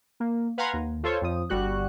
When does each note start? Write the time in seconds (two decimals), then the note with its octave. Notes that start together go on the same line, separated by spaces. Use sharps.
0.20 A#3
0.58 B4 F5 F#5 G#5 A#5 C6
0.73 D#2
1.03 F4 A4 C5 C#5
1.22 F2 F3 D#6
1.49 G1 G3 F#4 F#6